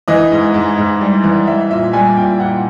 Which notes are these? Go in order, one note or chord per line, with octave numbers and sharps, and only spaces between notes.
E3 D#5
G#2
G#2
G#2
G3
E3
G3 E5
A#2 E5
G3 G#5
A#2 G5
A#2 F#5